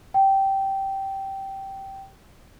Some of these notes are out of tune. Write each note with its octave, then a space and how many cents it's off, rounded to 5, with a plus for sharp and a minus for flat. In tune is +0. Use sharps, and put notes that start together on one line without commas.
G5 -15